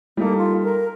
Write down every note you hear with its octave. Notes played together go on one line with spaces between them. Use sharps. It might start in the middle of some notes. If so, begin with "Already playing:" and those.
G3 A#3 D#4 A4
F4
A#4